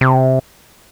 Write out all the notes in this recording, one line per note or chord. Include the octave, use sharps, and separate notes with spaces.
C3